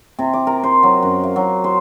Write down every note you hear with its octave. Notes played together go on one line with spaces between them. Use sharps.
C3
D6
A#4
C5
F#3
F#2
F5
F#3
C5